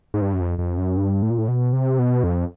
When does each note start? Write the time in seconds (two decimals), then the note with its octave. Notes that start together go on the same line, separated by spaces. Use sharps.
0.14 G#2
0.22 G2
0.34 F#2
0.41 F2
0.59 F2
0.78 F#2
0.97 G2
1.22 A2
1.30 A#2
1.38 A2
1.48 B2
1.73 C3
1.99 B2
2.24 F2